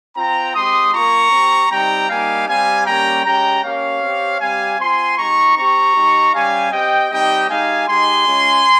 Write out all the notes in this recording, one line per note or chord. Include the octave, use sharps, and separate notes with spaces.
C4 F4 G5 A#5
G#3 C4 G4 C6 D#6
A#3 F4 A#5 C#6
C4 G4
G3 C4 D#4 G4 G5 A#5
G3 A#3 D#4 G4 F5 G#5
G3 C4 G4 F5 G#5
G3 A#3 C#4 G4 G5 A#5
G#3 C#4 G4 G5 A#5
A#3 C#4 G4 C#5 F5
C4 G4
G3 C4 G4 F5 G#5
C4 F4 G#5 C6
G#3 D#4 G4 A#5 C#6
C4 G4 A#5 C#6
G#3 D#4 G4
G3 C#4 G4 F5 G#5
C4 G4 D#5 G5
G3 C4 D#4 G4 D#5 G5
G#3 D#4 G4 F5 G#5
G#3 D#4 G4 G#5 C6
G#3 C#4 F4